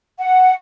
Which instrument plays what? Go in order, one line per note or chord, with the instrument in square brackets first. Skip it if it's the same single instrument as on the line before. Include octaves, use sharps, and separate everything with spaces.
[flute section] F#5